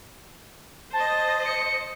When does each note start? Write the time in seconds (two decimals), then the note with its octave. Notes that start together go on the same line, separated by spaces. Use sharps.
0.93 C5 D#5 A5
1.45 C#7